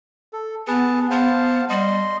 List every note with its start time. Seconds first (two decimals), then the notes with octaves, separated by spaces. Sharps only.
0.33 A4
0.67 B3 G#4 B4 A5
1.11 B3 C5 F5 A5
1.70 G3 D#5 C6